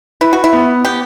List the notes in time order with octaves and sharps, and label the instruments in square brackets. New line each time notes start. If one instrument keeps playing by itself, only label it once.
[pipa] E4 [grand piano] B4
[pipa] F#4
E4
[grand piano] B3
[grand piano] B3 [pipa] G4